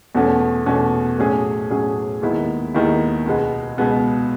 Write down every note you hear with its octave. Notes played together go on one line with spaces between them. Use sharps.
E2 B2 A3 C#4 F#4
E2 B2 A3 C#4 F#4
A2 F#3 C#4 G#4
A2 F#3 C#4 G#4
D#2 D#3 G#3 B3 E4
D#2 D#3 G#3 B3 E4
C#2 B2 G#3 B3
C#2 B2 G#3 B3